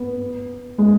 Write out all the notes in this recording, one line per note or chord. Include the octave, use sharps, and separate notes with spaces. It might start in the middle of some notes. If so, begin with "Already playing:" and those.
Already playing: B3
G#3